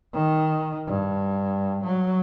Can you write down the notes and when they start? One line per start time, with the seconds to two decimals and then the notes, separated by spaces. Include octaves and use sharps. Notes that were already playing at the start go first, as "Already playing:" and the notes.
0.13 D#3
0.87 G2
1.84 F#3